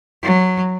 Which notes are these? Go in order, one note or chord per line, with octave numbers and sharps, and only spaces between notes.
F#3